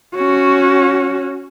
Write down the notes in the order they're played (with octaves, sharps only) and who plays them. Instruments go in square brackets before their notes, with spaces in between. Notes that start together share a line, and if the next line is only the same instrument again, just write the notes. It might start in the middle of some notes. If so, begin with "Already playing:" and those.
[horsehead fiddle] C#4 F#4